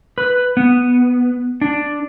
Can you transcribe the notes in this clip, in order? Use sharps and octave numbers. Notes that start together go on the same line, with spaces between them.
B4
B3
D4